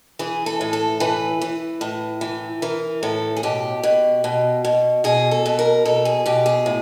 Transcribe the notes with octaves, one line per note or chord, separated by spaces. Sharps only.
E3 G#4
A4
A2
A4
E3 B4
E3
A2
E3
E3 A#4
A2 A4
G#4
B2 G4
B2
B2
B2
B2 G#4
A4
B2
A#4
B2 A4
G#4
B2 G4
G#4
A2